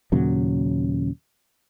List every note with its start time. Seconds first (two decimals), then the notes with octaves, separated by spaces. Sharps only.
0.12 D#2 A#2 C#3 F#3